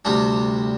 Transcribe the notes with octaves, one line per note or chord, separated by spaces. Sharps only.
D2 C3 G3 D4